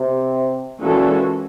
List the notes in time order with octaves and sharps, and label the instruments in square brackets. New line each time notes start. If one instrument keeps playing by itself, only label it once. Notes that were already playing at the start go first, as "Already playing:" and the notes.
Already playing: [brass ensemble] C3
[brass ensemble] A#2 [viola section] E3 G#3 C#4 F#4 A4